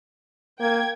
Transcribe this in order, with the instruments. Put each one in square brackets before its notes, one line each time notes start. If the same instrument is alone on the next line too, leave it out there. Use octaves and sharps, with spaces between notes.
[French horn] A#3 [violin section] G5 G#6